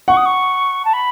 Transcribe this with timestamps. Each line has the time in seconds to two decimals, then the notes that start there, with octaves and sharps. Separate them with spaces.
0.08 F#5 C#6
0.17 D#6
0.26 C#6
0.85 A5
0.93 B5